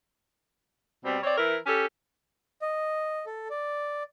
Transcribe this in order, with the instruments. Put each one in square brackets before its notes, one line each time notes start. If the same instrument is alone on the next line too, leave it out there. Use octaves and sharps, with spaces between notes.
[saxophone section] B2 G3 C4
C4 C#5 D5
E3 E4 A#4
C#4 G4 A4
[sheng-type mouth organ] D#5
A4
D5